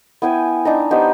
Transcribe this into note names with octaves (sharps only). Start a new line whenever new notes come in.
B3 E4 G5 G#5
D4 D#4 A#5
B3 D#4 G4 C5